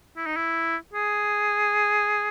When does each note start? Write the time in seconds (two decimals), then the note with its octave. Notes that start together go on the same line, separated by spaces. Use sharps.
0.17 E4
0.26 D#4
0.36 E4
0.94 G#4